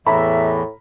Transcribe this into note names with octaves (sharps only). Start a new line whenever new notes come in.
E2 A2 E3 E5 A#5 B5